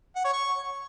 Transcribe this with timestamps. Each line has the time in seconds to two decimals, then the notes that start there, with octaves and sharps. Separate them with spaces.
0.16 F#5
0.25 C#5
0.33 C#6